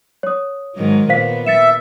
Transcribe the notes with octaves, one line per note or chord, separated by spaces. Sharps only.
C#5 D#6
G#2 D#3 F#3
A#2 B3 C5 F5 B6
E5 A6 C#7 E7